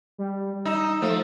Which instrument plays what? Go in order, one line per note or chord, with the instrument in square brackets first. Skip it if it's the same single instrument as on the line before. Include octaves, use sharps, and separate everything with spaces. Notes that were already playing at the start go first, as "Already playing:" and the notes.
[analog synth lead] G3
[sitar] D#4 [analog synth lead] E6
[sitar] F3 [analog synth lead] A3